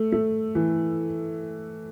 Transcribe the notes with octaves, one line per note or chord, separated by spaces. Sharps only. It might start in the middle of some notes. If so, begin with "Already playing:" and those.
Already playing: A3
A3
E3